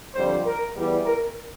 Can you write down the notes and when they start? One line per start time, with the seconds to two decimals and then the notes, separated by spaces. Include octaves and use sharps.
0.15 F2 D3 G3 C5
0.45 A#4
0.75 E2 E3 G3
1.05 A#4